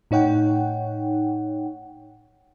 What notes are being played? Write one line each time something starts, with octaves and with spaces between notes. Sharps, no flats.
A2 D#4 C#5 F#5 G5